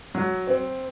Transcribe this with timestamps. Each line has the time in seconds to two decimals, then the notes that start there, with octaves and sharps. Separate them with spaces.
0.15 F#3
0.47 C4